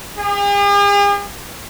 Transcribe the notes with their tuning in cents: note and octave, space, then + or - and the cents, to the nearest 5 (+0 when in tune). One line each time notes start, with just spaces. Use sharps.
G#4 -45